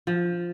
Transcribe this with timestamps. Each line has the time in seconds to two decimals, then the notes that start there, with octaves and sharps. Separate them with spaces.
0.07 F3